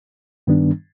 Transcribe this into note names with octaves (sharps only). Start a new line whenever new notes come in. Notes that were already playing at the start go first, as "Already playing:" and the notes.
G2 D#3 G3 B3 D4